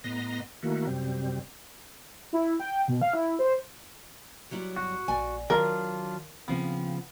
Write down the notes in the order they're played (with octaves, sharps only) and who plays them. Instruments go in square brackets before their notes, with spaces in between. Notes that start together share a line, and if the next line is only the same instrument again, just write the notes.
[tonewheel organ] A2 B3 D#5 A#5 C6 A#6
D#3 A3 A#3 E4 F#4
F#2 C3 G3 C4
[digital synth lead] E4
G5
B2
F5
E4
C5
[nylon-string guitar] F#3 G3 E4
[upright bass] G1 [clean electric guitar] F#4
[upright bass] A#1 [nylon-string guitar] D5 G#5
[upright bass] D#3 [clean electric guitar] F#3 D4 F4 [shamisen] A#4
[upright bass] D#2 [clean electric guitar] C#3 F3 B3 [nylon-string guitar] C4